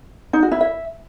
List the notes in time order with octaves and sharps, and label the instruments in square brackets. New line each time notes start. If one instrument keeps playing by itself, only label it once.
[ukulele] D#4
F#4
E4
E5